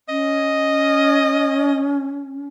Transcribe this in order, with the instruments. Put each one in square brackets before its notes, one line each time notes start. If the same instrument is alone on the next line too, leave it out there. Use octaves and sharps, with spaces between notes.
[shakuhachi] C#4 [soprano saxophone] D#5